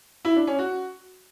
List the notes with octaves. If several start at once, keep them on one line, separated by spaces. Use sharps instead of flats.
E4
D4
C#4
F#4